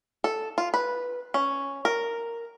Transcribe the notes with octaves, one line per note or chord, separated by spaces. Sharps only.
A4
F4
B4
C#4
A#4